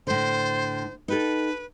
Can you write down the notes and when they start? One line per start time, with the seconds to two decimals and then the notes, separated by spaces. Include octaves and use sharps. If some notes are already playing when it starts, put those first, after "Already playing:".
0.07 A2 D3 C5
1.08 D#4 G4 A4 B4